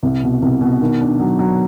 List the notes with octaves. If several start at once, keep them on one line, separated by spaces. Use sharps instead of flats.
C2
B2
C2
B2
D#3
D4
F#3
F#3